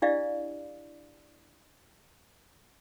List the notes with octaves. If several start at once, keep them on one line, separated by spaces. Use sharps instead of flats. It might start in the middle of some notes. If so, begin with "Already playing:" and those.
D4 E4 G4 D5 D#5 F5